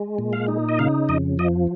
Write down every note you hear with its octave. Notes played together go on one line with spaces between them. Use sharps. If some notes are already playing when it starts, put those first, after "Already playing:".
Already playing: G#3
A#2
F5
D#4
D#5
C#3 F5
F2 D#5
F3 D#5